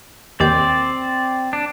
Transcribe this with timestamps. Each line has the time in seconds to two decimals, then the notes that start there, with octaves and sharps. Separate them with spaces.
0.40 D#2 D#3 C4 D5 G6
1.53 D4